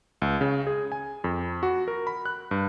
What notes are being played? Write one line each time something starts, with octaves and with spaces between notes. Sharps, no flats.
C#2
C#3
G#4
G#5
F2
F#4
A#4
B5
F#6
G2